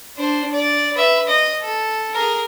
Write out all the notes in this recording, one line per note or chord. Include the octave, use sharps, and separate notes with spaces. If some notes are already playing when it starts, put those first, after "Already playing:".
D4 C5
D5
B4 E5
D#5
A4
G#4 A#4